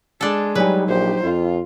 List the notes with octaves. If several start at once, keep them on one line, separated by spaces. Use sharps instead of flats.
G#3 D4 A4
F#3 G3 D#4 B4 G#5
A#1 G4 C5
F2 F4